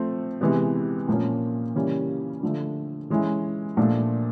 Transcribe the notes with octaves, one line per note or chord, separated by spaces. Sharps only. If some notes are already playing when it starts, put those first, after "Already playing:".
Already playing: F3 A3 C4
C3 E3 G#3 B3
A#2 F3 A#3 C#4
C#3 E3 G3 A#3 C#4
D3 F3 A3
E3 G#3 C#4 E4
A#2 F3 A3 D4